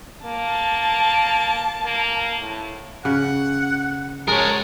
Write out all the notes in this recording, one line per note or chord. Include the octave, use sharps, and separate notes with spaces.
A#3 A5
A#3
A2
C#3 F#5
G#3 A#4 C#5 A5